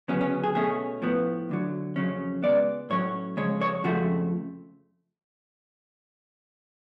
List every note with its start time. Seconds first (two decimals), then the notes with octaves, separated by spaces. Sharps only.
0.08 D2 C#3 F#3 B3 C#4
0.21 C#4
0.44 G#4
0.55 B2 A3 C#4 G#4
1.02 A2 F3 B3
1.49 D2 D3 F#3
1.96 F2 C#3 F#3 C#4
2.43 C#2 B2 G#3 B3 D5
2.90 A2 F#3 C#4 C#5
3.37 F2 C#3 G#3 C#5
3.61 C#5
3.84 F2 C#3 F3 A3 F#4